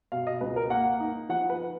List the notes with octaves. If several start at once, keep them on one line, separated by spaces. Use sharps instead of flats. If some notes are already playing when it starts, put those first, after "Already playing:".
B2 F5
D#5
C#2 B4
A#4
A#3 F#5
D#4
F3 F#5
B4